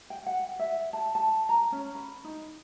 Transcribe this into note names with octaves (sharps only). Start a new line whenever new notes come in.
G5
F#5
E5
A5
A5
A#5
C#4
B5
D#4